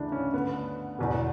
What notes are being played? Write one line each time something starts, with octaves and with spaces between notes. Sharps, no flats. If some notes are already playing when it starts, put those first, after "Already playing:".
Already playing: D2 C#3 E3 D4 E4
C#4
D2 D3 B3
E1 E2 B2